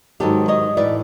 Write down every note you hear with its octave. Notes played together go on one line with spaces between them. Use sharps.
G#2 D#3 F#3 G4 A4
C#5 D#5
A2 E3 D5 E5